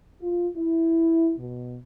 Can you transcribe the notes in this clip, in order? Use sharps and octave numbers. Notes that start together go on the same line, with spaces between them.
F4
E4
B2